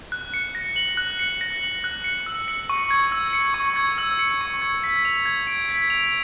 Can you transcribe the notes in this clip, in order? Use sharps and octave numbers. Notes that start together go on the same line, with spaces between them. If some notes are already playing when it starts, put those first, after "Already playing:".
F#6
C#7
A#6
F#7
F#6
C#7
A#6
F#7
F#6
C#7
E6
C#7
C#6
G#6
E6
C#7
C#6
G#6
E6
C#7
C#6
G#6
B6
F7
G#6
D7
B6
F7